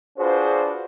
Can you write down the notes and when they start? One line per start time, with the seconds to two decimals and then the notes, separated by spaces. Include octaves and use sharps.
0.19 D4 F4 F#4 G#4 B4 C5